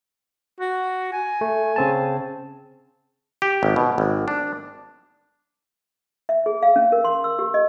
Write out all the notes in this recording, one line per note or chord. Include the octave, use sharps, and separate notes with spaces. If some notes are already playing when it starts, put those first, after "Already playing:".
F#4
G#5
A3
C#3 C4 A5
G4
G#1
B2
G#1
D4
E5
G#4
F5
C#4
A#4
C6
E6
G4
D#5